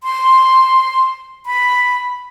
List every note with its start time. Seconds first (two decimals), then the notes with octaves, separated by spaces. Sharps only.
0.03 C6
1.46 B5